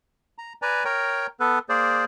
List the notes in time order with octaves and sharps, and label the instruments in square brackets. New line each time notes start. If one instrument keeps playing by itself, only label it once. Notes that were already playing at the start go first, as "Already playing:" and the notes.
[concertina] A#5
B4 D5 G#5 A#5
A#4 C#5 G5 A#5
B3 A4 B4
A#3 G#4 C5 D5